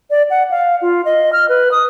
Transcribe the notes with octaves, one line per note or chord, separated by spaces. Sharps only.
D5
F#5
F5
F4
D#5
F6
B4
D#6